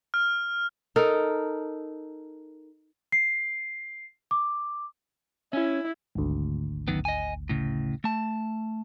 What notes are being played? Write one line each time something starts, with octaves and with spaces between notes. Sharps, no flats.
F6
D#4 A4 A#4
C7
D6
C#4 E4
G#1 D2
F#2 D#3 B3
D#5 G#5
A2 C#3
A3 A5